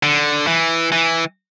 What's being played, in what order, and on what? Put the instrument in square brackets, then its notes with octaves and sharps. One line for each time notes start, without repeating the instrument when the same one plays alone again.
[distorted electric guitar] D3
E3
E3